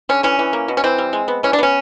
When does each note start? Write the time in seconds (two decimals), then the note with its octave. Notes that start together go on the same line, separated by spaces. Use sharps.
0.09 D3 C#4
0.23 E3 C#4
0.39 E3
0.53 A#3
0.68 B2
0.77 C#4
0.84 E3 C4
0.98 G3
1.13 G#3
1.28 B3
1.43 E3 C#4
1.53 D4
1.59 B3 C#4